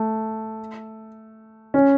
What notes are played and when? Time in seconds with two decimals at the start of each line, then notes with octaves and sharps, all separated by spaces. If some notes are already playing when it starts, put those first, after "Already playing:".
Already playing: A3
1.74 C#4